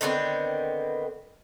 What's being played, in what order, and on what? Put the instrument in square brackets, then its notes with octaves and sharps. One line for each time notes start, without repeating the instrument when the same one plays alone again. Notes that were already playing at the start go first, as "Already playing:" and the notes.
[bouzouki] D3 D#3 B3 C4